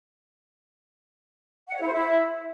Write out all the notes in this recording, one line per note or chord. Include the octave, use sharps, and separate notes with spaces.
F#5
C#5
E4
C5
E4